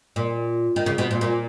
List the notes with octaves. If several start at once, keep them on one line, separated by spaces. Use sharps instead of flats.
A#2
D#3
C#3
B2
A#2
A#2